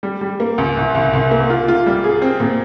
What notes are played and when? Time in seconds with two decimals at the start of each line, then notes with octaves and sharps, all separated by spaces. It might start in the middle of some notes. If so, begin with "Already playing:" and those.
0.03 G3
0.21 G3
0.40 A#3
0.58 C#2
0.77 C2
0.95 C2
1.13 C2
1.31 A#3
1.50 F4
1.68 F4
1.86 G3
2.04 G#4
2.22 C4
2.40 A#2